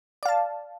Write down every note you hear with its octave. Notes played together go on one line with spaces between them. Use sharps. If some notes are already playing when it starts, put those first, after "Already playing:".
D5 F5 A5